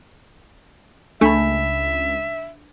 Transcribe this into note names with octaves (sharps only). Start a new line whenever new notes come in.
C#2 A3 D4 E5 B5